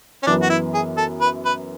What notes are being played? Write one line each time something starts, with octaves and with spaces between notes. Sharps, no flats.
C#4
F#2 E3 B3 D4
F#4
E4
G#4
A4
B4
B4